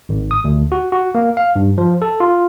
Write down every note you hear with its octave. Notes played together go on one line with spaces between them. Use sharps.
G#1
D#6
D2
F#4
F#4
A#3
F5
G2
F3
A4
F4